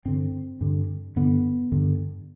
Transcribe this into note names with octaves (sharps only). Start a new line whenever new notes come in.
G2 D3 C4
G2 D3
G2 D3 B3
G2 D3